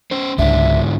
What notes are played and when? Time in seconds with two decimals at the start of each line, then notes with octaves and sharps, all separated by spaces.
0.11 C#4 C5
0.38 C#2 G#2 D3 D4 E5